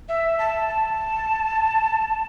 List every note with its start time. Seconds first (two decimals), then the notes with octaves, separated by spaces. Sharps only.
0.09 E5
0.39 A5
0.68 A5